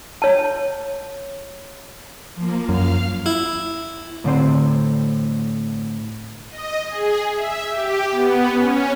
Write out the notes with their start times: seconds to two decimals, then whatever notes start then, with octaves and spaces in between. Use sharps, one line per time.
0.22 C#5 A5
2.36 F3 A#3
2.69 F#2 F5 F6
3.26 E4
4.24 A2 D3 C4 C5
6.49 D#5
6.88 G#4
7.33 E5
7.69 G4
8.11 B3
8.51 C#4